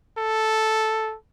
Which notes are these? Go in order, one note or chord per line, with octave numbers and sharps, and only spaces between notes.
A4